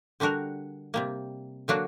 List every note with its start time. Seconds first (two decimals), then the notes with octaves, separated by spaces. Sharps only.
0.20 D3 G3 D4 F#4 A#4
0.94 C3 G3 A#3
1.68 D3 F#3 A#3 D4 F#4